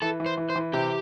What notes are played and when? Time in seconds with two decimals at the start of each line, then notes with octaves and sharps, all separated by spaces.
0.02 E3 A4
0.20 E3
0.26 C5
0.37 E3
0.50 C5
0.56 E3
0.73 C3 G4